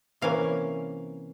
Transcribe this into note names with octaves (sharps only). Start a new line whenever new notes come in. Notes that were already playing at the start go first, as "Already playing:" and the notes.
C3 E3 A#3 C#4 F5